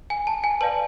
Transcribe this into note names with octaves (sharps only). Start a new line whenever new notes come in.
G#5
A5
G#5
B4 D5 F5 A5